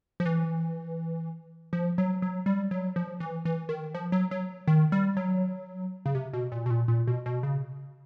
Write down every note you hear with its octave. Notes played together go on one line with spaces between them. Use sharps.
F3
E3
F3
F#3
F#3
G3
F#3
F3
E3
E3
D#3
F3
F#3
F#3
D#3
G3
F#3
C#3
C3
B2
A#2
B2
A#2
A#2
B2
B2
C#3